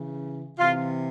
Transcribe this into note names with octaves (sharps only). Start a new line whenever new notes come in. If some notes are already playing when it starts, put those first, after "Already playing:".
Already playing: C#3 E3
C3 E3 F4